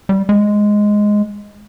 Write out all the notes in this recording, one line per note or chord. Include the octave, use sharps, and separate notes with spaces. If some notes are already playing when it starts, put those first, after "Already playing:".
G3
G#3